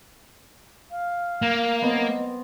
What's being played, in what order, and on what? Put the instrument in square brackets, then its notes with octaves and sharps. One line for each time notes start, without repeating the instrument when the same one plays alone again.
[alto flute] F5
[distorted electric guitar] A#3
[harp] B3 C4 [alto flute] D#5